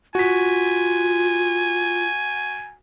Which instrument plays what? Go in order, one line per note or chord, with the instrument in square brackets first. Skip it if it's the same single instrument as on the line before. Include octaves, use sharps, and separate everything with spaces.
[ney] F4 [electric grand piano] F#4 B6 [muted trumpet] G#5